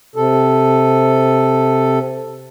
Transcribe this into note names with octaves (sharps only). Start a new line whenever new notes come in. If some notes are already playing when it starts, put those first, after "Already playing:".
C3 A4